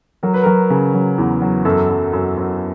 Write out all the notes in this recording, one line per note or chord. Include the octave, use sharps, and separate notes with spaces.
F#3 A#4
B4
F#3 A#4
C#3
F#3
E2
F#3
F#2 A4
F#2
F#2
F#2